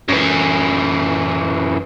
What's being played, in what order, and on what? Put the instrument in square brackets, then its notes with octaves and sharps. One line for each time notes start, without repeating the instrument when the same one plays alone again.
[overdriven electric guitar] F#2 E3